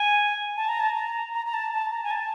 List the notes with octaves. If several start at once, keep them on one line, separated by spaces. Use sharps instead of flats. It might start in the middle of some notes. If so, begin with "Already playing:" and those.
Already playing: G#5
A5
A#5
A5
A#5
A#5
A#5
A5
A5
A#5
G#5
A5